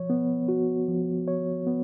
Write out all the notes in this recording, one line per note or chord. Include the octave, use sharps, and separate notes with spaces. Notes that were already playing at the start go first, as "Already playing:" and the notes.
Already playing: F3 C#5
B3
F#4
F3
C#5
B3